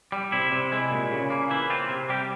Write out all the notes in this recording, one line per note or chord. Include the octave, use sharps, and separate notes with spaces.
G3
C3 E4
C3
G#3 E4
A#2
C#3
A#3
E3 E4
C4 F4
C3
G3 G4